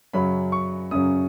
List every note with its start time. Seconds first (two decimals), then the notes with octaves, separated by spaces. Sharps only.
0.13 F#2 C#3 F#3 B5
0.52 C#6
0.91 F#2 C#3 F#3 D#6